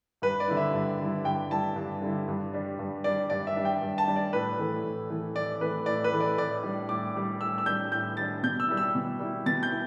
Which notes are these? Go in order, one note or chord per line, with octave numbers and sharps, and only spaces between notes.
G2 B4
D5
D3 G3 E4
E5
G2
D3 G3 E4
G2 G5
D3 G3 E4 A5
G2
D3 G3 E4
G2
G3 D4
G2
G3 D4 D5
G2 D5
E5
G3 D4
G5
G2
A5
G3 D4
D5
A2 B4
E3 A3
A2
E3 A3
A2 D5
E3 A3 B4
A2 D5
B4
E3 A3
D5
A2 D5
G3 D4
A2 D6
G3 D4
A2 E6
E6
G3 D4 G6
A2 G6
G3 D4 A6
B2 G6
E6
G3 E4
E6
B2
G3 E4
B2 A6
G6
E4